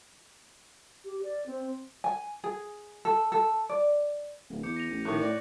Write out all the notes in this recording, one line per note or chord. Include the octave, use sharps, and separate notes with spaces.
G4
D5
C4
G#5
G#4
A4
A4
D5
D1
E2 D6 G6 C#7
A#6 D#7 F7
A1
A2 D#3 C#6 D6 F#6
A2 D5